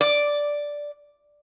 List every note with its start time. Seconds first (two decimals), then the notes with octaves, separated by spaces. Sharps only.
0.01 D5